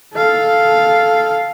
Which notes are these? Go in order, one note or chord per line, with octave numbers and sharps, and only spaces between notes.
A4 F5